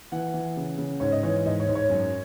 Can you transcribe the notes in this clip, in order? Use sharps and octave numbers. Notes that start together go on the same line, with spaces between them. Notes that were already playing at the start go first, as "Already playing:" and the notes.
E3 F#5
E3
C#3
C#3
G#2 C#5
D#5
E3 C#5
G#2 D#5
C#5
G#2
C#5
F#2